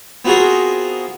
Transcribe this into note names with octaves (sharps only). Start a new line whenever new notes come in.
B3 C4 F4 F#4 G#4 A#4